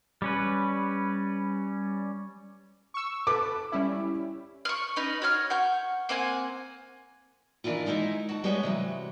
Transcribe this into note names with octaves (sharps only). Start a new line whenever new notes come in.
G3 C#4 B4
C#6 E6
A4 B4 D6
G3 C#4 E4
C#6 F6
C#4 D#4 B4
F#4 C#5 F6
F#5 C#6 G6
A#3 C4 F#5 G#5
D#3 E3 D4 E4 F4
G#3 D#4 E4 D#5 E5
F#4 A5
G3 G#3 B3 C#5 D#5
C3 E3 F#3